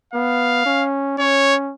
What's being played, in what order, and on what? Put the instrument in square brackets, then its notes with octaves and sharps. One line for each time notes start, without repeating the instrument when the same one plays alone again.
[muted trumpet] B3 [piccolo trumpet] F5
[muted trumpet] C#4
[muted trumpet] C#4 [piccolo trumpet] C#5